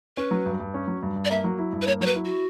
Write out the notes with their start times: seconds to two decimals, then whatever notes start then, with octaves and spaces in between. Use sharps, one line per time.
0.17 C#4 B4
0.31 F#3
0.46 G2
0.60 G2
0.74 C#4
0.87 F#3
1.03 G2
1.16 G2
1.25 D5
1.30 A#3 E5
1.44 F#3
1.58 E4
1.72 G2
1.82 B4
1.87 A#3 C#5
2.01 F#3 C#5
2.06 B4
2.15 E4
2.25 F#4